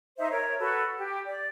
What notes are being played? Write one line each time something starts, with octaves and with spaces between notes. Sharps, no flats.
D#4 C5 E5
A#4 C#5
F#4 A4 B4
G4
D5